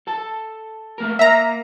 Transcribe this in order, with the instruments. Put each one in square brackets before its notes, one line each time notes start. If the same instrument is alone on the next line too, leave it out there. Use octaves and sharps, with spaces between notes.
[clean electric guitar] A4 A5
A3 A#3 A#4
[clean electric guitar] A#3 [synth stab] E5 A#5